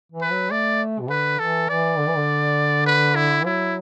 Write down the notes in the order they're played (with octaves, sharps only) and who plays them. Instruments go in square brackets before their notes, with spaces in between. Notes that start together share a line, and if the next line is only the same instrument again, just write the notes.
[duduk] E3
[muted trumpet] B4
[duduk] F#3
[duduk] A3 [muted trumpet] D5
[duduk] B2
[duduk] D3 [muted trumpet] B4
[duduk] E3 [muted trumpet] A4
[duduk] E3 [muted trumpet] D5
[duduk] D3
E3
D3
[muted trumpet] B4
E4
[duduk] F#3 [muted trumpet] E4